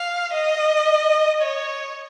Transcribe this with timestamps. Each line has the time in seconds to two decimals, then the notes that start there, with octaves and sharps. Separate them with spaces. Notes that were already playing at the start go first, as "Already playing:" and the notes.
Already playing: F5
0.33 D#5
1.42 C#5